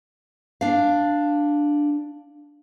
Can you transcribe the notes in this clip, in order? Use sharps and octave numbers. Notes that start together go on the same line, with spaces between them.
D4 F5